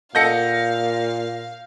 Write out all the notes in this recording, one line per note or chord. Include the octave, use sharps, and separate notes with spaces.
A#2 A4 D#5 F5 F#5 G6 A#6 C#7